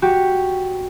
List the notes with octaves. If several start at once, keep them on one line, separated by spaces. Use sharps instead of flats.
F#4 G4